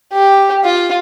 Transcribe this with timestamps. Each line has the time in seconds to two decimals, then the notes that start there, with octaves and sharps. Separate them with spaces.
0.12 G4
0.64 F4